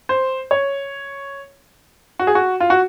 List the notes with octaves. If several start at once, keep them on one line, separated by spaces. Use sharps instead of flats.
C5
C#5
F#4
G#4
F#4
F4
F#4